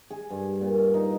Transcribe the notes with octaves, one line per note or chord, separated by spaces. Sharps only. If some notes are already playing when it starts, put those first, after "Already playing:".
G#4
G2
A#2
D#4